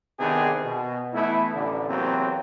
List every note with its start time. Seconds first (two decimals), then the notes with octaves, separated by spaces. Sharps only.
0.19 C3 D#3 B3 C4 D4 G#4
0.64 B2
1.14 E3 A3 B3 E4
1.53 A1 D3
1.89 E2 C3 F#3 A#3 C4